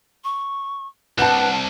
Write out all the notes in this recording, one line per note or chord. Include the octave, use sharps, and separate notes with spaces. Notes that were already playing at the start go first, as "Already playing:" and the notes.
C#6
C2 B4 F#5 A5 F#6 E7